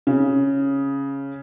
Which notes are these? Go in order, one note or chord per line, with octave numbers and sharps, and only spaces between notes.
C#3